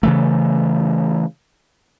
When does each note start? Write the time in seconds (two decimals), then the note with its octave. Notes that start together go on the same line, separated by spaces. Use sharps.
0.03 C#3 E3 A3